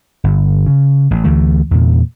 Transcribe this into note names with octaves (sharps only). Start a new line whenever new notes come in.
G1
C#3
A1
D2 E3 A3
E2 A#2